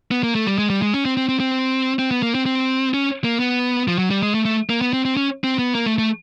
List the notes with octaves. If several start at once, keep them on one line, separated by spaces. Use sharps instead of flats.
B3
A#3
A3
G3
G#3
G3
G#3
C#4
C4
C4
C4
C4
C4
B3
A#3
C4
C4
C#4
A#3
B3
F3
F#3
G3
G#3
A3
A3
A#3
B3
C4
C4
C#4
C4
B3
A#3
A3
A3